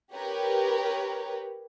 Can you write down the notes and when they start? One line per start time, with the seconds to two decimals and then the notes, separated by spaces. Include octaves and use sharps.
0.14 G4 A#4 B4 C#5